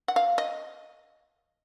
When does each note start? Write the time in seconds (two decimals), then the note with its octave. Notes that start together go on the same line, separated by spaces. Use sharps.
0.08 F#5
0.16 F5
0.38 D#5